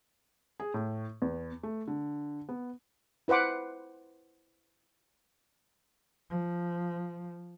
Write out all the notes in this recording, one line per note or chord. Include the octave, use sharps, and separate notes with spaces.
G#4
A2
E2
A3
D3
B3
E4 B4 C5 F#5 D6
F3